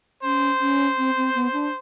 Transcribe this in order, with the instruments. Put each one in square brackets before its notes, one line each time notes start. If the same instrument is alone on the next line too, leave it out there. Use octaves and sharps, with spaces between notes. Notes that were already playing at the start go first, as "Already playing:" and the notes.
[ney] C#4 [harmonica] C5
[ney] C#4
C4
C4
B3
D4